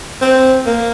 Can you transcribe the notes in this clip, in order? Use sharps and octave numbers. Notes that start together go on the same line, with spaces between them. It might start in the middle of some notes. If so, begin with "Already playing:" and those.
C4
A#3